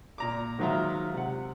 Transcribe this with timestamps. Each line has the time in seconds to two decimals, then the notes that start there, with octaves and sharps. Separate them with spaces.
0.18 A#2 A#5 D6
0.59 G#2 D#3 F#3 F4 E5 A#5
1.14 C3 F#5